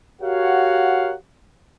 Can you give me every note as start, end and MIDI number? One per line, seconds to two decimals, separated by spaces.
0.22 1.15 66
0.22 1.15 67
0.22 1.15 70
0.22 1.15 73
0.22 1.15 77
0.22 1.15 78